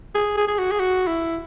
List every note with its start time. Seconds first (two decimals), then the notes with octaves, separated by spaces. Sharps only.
0.15 G#4
0.37 G#4
0.48 G#4
0.58 F#4
0.71 G#4
0.80 F#4
1.07 E4